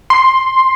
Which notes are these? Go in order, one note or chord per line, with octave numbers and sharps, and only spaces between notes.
C6